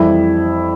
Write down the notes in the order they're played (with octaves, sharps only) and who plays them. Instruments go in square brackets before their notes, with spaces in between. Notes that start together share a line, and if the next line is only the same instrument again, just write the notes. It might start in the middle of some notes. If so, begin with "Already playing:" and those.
Already playing: [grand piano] F2 E3 G3 E4